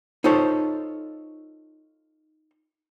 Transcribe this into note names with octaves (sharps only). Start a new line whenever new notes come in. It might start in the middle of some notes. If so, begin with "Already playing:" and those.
D#4 F4 A4 C5 C#5